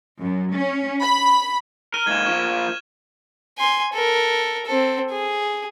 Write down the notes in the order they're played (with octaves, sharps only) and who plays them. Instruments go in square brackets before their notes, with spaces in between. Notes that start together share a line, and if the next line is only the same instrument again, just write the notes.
[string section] F#2
C#4
B5
[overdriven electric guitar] A#4 [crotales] F6 D#7 G7
[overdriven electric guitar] G#2 A#3 [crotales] G#6 E7
[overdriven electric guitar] F3 A#3 [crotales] C#6
[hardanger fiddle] G#5 C6
A4 A#4
C4 A4
G#4